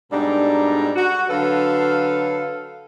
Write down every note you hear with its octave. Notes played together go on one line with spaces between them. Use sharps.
G#2 B2 G3 D4 A4 A#5
F#4
D3 F#3 A4 B4 F5